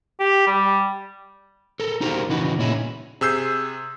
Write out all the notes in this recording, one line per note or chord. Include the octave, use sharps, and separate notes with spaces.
G4
G3
A4 A#4
D#4 F#4 G4 A#4 C5 F5
C#3 E3 D#4 F#4 B4
A#2 C#4 D#4 E4 F#4 G#4
C3 G#4 E6 G6 C7